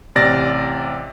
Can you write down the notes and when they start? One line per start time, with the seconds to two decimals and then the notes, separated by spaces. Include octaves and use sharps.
0.15 A1 C3 D5 A6 A#6